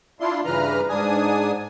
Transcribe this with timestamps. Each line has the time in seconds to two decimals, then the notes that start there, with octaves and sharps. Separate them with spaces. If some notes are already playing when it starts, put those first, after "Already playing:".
0.20 D4 E4 F4 C6
0.45 G2 C#3 E3 B4 A#5 F6
0.89 G#2 D4 G#5 D#6